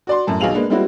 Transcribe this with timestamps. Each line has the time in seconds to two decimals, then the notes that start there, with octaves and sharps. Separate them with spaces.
0.07 F#4 D5 C6
0.27 F#2 A2 A5
0.40 B1 B2 G#4 F5 F7 F#7
0.54 G#3 A#3 B3 D4
0.70 G3 G#3 A#3 C4 E4 F#4